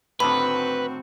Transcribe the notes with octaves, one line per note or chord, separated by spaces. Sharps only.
A2 D3 D#3 C4 F#4 B4 B5